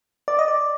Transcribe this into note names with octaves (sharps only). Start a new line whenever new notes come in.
D5
D#5
D5